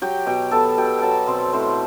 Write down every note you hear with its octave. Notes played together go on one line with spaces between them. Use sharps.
F#3 G4 G5
B2 G4 G5
B3 A4 A5
B2 G4 G5
F#3 A4 G5 A5
B2 C4 C5
A2 C4 C5